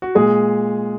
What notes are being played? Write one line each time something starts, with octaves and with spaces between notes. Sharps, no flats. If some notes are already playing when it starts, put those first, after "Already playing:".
F#4
A#2 G#3 G#4